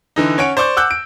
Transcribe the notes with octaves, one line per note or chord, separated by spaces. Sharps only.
D3 E3 D#4
C#4 C#5 F#5 D7
C5 D5 C#6 D6 G6
F#5 D6 E6 F#6 G6
D7